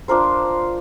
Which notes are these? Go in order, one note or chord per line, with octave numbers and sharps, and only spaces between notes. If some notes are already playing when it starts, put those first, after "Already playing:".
D4 F4 A#4 C5